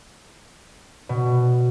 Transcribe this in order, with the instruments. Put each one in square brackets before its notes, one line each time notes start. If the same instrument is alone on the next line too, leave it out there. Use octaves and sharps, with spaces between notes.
[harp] B2